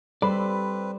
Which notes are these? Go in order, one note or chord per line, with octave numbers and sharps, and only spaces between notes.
G3 C4 A4 B4 C5 D5 B5